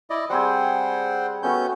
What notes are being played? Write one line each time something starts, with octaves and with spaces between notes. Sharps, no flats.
E4 D5 D#5
G3 C4 G#4 C5 F#5 G5
A3 B3 C#4 F#4 G6